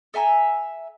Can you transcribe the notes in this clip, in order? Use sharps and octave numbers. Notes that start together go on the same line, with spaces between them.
A4 E5 G#5 A#5